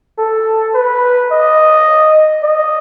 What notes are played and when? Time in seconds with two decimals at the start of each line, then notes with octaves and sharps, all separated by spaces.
0.18 A4
0.74 B4
1.32 D#5
2.43 D#5